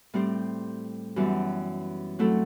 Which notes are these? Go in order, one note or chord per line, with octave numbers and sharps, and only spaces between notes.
A2 G3 C4 G4 C5
F#2 E3 G3 B3
F#3 A3 C4 E4 A4